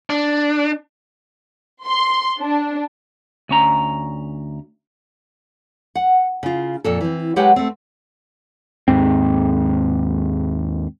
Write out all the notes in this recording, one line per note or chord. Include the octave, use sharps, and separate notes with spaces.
D4
C6
D4
D2 C#4 A#5
F#5
C#3 F4
F2 A#2 A4
E3 C4
F#3 G#3 G4 B4 F#5 G5
A3 C4
D#2 G#2 C4